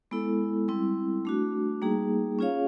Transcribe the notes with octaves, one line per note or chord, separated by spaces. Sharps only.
G#3 B3 E4 A4
G3 C4 E4
A3 D4 F#4
G3 A#3 D#4 G#4
C#4 F4 G#4 C#5 F5